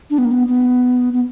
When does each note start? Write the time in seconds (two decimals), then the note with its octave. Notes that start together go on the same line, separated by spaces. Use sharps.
0.10 D4
0.18 B3
0.25 A#3
0.31 B3
0.48 B3
1.13 B3